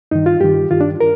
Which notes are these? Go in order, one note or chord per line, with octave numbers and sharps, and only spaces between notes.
G2 D#3 D#4
F4
G2 D#3 G4
G2 D#3 F4
D4
A#4